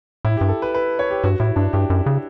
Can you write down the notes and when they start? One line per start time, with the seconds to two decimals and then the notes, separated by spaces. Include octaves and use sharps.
0.25 A2 E4
0.37 G2 G4
0.49 A4
0.62 B4
0.75 B4
0.99 C#5
1.11 G4
1.24 G2 F#4
1.40 A2 E4
1.56 G2 D4
1.73 G2 G4
1.90 F#2
2.06 C#3